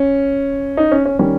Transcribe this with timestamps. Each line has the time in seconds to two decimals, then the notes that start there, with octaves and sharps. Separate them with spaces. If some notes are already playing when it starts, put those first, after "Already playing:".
Already playing: C#4
0.77 D#4
0.92 C#4
1.05 C#4
1.19 D#3 G3 C#4